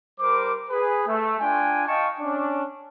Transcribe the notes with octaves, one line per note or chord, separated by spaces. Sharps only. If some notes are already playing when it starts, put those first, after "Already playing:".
G3 A#4 C5 D6
G#4 B4
A3
D4 F4 G5 G#5
D#5 F5 G5 A5 C#6
C#4 D4